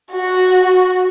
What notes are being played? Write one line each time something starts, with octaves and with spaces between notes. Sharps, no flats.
F#4